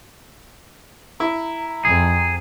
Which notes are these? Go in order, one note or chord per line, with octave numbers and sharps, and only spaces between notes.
E4 A#5
F2 G#4